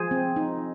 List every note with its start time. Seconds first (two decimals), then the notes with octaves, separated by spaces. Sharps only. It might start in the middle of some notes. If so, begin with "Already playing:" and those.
Already playing: F3 G#4 C5
0.11 C4
0.36 D#4